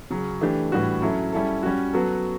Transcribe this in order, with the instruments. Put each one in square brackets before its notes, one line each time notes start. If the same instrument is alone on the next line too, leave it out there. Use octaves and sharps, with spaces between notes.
[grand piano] C#3 F#3 C#4
E3 A3 D4 G4
A2 E3 G3 D4 F#4
F#3 C#4 E4 A4
G3 C#4 E4 A4
G3 C#4 F#4
F#3 B3 F#4 A4